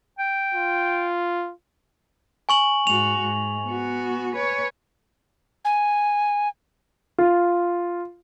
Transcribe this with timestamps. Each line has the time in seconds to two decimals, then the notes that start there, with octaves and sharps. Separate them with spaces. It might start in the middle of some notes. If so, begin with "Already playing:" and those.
0.19 G5
0.55 F4
2.49 G#5 C#6 F#7
2.87 G#2 F#4 F7
3.20 G#2
3.66 B3 F#4
4.35 B4 C#5
5.65 G#5
7.18 F4